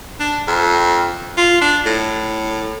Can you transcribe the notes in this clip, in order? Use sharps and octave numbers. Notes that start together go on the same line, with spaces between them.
D4
F2
F4
D4
A2